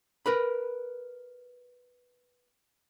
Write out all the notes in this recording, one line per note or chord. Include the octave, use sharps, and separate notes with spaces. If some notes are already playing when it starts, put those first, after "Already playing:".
A#4 B4 B5